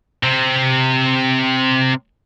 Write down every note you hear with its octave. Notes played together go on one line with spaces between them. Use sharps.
C3 C4